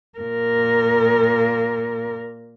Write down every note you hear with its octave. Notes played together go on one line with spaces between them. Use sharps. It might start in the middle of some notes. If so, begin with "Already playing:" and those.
A#2 A#4